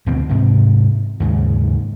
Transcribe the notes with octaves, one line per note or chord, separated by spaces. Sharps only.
D2 B2 E3 C4
G#2 C3
D#2 G#2 C#3